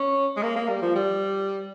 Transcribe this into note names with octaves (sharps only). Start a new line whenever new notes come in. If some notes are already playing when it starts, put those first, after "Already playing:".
Already playing: C#4
G#3
A#3
A#3
G3
F3
G3